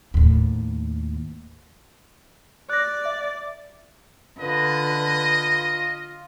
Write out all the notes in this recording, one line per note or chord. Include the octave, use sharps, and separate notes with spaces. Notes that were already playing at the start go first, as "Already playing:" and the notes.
D#2 A2
D5 F#6 A#6
E5
D3 F4 B4 D#5